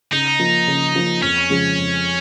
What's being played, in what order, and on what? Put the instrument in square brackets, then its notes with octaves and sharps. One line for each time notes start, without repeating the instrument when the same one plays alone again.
[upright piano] C#3 [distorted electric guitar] D#4
[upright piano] F3 A#3 F4
C#3
F3 A#3 F4
[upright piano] F2 [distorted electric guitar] C#4
[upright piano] C#3 F3 G#3
F2